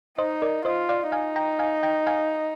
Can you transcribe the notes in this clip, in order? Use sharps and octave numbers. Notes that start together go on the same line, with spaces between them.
D#4 C5 D#5
A#4 D5
F4 C5 D#5
D5 F5
D#4 F5 G#5
G5 A#5
F5 G#5
G5 A#5
F5 G#5